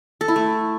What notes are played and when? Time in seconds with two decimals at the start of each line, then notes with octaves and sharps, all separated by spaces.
0.21 A4
0.28 E4
0.36 A3